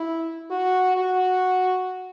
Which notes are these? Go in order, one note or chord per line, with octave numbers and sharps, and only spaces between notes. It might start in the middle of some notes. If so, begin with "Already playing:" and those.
Already playing: E4
F#4
F#4